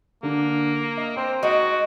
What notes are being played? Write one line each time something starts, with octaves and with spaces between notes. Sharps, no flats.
D3 A#3
D#5
C4 C5
G#3 D#4 F#4 D#5 D7